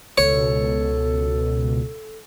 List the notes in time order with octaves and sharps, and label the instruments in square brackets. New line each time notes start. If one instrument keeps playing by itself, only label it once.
[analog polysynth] C#2 B2 [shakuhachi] A4 [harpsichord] C#5